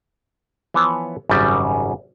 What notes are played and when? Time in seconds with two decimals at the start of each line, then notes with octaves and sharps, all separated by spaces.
0.74 E3 F3 B3 B4 C#5
1.29 G#1 F#2 C#3 G3